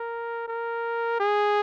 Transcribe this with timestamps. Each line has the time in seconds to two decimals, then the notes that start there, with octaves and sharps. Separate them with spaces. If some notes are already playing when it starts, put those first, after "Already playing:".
Already playing: A#4
0.48 A#4
1.20 G#4